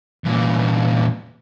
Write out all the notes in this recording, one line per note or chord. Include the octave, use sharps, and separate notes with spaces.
E2 A#2